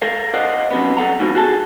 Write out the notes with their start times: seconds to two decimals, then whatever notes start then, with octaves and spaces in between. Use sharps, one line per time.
0.02 A4 A#4 F5
0.34 A#4 C5 D5 D#5 F5 F#5
0.71 F#2 C3 B3
0.97 G3 A4 F#5 A#5
1.19 G#2 B2 D3 E3 F3
1.35 F#4 G#4 A4 A5